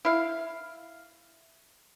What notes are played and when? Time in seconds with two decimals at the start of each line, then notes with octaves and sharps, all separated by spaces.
0.05 E4 F5